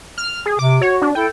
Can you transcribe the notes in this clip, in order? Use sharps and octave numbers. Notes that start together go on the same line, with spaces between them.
F6
G#4
C3 D6
F#4 C#5
D4
E4 A4 G5